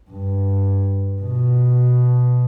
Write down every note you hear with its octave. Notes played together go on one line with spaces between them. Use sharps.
G2
B2